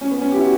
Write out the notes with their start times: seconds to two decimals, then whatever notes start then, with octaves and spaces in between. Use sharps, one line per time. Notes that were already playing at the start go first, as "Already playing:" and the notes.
0.01 C#4
0.11 B3
0.21 C#4
0.31 G4
0.36 E4
0.41 F#4